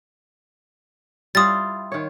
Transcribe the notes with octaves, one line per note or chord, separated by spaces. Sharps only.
G3 E4 F4 D#6 A6
D#3 C#5